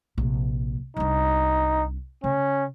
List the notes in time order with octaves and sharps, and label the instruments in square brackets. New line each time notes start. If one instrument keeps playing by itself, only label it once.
[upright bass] A#1 C3
[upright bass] C2 D4 [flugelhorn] D#4
[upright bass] C#3 [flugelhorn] C#4